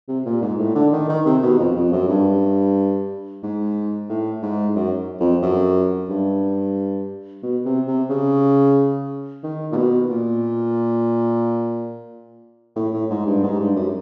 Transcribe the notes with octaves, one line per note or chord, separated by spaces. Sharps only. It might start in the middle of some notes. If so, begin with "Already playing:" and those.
C3
A#2
G#2
A2
D3
D#3
D#3
C3
B2
F2
F2
F#2
G2
G#2
A2
G#2
F#2
F2
F#2
G2
B2
C3
C3
C#3
D#3
A#2
B2
A#2
A2
A2
G#2
G2
G#2
G2
F#2